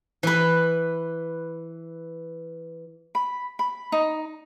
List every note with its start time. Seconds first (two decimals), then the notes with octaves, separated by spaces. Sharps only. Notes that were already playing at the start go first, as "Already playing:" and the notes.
0.23 E3 B4
3.15 B5
3.59 B5
3.92 D#4